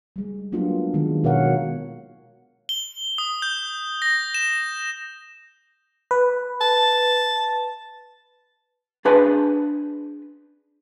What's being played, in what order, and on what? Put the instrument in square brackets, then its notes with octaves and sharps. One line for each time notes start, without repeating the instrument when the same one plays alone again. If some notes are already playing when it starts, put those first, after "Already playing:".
[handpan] G3 G#3
F#3 A#3 B3 D4 F4 G4
D#3 G#3
B2 A#4 C#5 F5 F#5
[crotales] G7
D#6
G6
A#6
E7
[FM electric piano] B4
[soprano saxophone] A5
[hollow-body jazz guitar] D4 G#4 B4 C5 G#5 A5